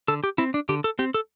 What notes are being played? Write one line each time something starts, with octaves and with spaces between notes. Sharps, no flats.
D3 A4
G4
C4 E4
D4
D3 G4
A4
C4 G4
A4